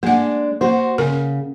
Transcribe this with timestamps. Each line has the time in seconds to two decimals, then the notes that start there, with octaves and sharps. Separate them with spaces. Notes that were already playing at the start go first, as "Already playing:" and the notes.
0.03 G#3 A#3 D4 F#5
0.61 A#3 F#4 C5
0.98 C#3 A#4